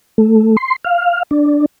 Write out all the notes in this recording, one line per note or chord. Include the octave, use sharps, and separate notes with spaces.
A3
C6
F5
D4